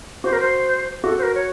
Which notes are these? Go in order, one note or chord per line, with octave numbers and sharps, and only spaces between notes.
F#4 C5
A#4
C5
F#4 A4
C5
A#4
C#5